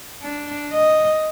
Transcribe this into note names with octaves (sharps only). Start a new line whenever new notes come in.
D4
D#5